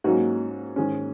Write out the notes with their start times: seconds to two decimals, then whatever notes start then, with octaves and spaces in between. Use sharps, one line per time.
0.04 G#2 F#3 A#3 C#4 D#4 F#4
0.76 G#2 D#3 G#3 C#4